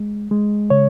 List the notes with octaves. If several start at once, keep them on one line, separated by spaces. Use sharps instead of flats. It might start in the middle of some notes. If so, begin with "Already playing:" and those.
Already playing: G#3
G#3
C#3 C#5